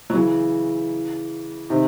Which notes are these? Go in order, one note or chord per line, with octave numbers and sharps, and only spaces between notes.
F#3
C#3 E3
C3 D#3